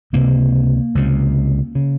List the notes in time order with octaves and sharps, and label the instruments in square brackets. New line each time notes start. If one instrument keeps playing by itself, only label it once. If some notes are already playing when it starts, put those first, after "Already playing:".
[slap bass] C#2 C3 A#3
C#2 C3
C#3